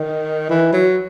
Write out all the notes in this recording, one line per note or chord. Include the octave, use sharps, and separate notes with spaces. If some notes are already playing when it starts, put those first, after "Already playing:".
Already playing: D#3
E3
F#3